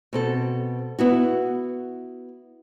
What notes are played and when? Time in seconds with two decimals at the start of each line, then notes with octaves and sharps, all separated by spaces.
0.13 B2 C4 A4
0.99 B3 E4 F#4